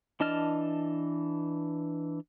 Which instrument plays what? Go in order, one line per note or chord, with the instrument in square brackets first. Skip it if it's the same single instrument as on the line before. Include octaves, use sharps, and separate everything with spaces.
[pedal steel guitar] E3 D4 D#5 A5 F6